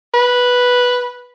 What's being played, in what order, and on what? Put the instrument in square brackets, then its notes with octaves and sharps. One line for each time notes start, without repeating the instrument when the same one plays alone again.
[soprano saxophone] B4